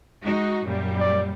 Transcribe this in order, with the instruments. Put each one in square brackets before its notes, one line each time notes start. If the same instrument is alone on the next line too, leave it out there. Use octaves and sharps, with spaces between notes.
[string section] G#3 D#4 F#4
F#2 A#2 G3
[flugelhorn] D5